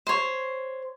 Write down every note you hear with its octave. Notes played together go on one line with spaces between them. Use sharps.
C5 C#5